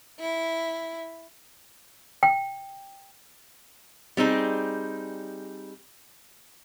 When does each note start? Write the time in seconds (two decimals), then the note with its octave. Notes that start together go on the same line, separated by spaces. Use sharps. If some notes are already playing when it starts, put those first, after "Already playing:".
0.20 E4
2.23 G5
4.17 G3 C4 D#4 G#4